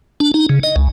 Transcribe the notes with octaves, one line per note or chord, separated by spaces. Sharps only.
D4
D#4
C#3
D#5
C#2